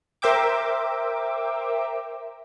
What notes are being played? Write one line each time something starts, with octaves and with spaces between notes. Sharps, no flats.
A#4 C5 E5 G5 D6